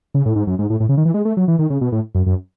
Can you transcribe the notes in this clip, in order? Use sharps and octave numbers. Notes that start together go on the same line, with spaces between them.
C#3
A2
G#2
F#2
G#2
A2
A2
C#3
D#3
E3
G#3
A3
F#3
E3
D#3
C#3
B2
A2
F#2
F#2